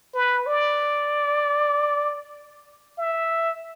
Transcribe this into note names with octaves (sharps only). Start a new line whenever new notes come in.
B4
D5
E5